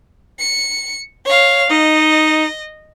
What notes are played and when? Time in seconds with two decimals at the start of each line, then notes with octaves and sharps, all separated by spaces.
0.39 C#7
1.26 C#5 F5
1.71 D#4 D#5